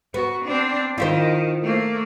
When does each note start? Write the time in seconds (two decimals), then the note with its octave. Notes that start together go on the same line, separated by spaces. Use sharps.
0.14 B3 F#4
0.45 C4 D4
0.98 D#3 E4 F4 C5
1.63 A3 A#3